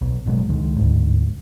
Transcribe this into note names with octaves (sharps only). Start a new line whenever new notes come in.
B1
F#1 B2 F#3 G#3
C#2 D#3 G#3
G1 D2 G#2